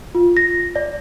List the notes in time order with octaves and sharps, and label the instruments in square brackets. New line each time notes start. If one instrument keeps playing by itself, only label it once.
[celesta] F4
A#6
D5